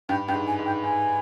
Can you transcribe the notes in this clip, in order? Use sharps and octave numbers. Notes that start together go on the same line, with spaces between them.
G2 G5
G2 G5
G#2
G#5
G#2
G5
G#2 G#5